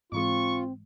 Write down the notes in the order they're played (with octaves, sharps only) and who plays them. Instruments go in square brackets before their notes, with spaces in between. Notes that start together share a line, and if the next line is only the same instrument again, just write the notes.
[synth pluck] G#2 E3 G#3 [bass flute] C4 [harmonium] F4 [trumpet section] C#6